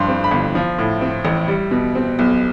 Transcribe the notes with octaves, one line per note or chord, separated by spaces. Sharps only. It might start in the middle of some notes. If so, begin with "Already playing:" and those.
Already playing: G2 F3 C6
C4
B5
G1
F3
A2
C4
A1
G3
B2
C4
B1